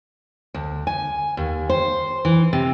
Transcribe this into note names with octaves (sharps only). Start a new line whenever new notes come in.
D2
G#5
D#2
C5
E3
C3